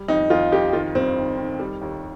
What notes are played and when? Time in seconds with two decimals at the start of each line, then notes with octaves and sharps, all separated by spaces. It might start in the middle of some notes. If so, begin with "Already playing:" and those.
Already playing: G3
0.08 F2 D#4
0.30 F2 F4
0.52 F2 G4
0.73 D#3 F4
0.95 G2 C4
1.16 D#3
1.38 D#3
1.59 G3
1.81 D#2